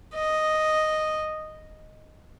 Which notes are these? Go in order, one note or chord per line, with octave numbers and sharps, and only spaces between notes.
D#5